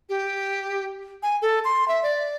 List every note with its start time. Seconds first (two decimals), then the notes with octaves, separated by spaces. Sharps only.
0.09 G4
1.23 G#5
1.42 A4
1.65 C6
1.88 E5
2.03 D5